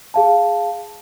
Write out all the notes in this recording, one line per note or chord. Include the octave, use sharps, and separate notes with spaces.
G#4 F5 A5